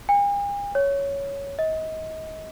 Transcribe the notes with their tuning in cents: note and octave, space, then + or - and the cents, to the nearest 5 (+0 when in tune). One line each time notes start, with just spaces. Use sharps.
G#5 -45
C#5 +10
D#5 +30